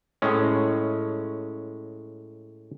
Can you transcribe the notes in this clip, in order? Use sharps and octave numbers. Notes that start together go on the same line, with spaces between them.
A2 G#3 C#4